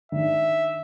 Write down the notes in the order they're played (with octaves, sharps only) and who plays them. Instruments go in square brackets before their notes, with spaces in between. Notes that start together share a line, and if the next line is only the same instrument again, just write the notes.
[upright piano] D#3 D4 [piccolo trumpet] E5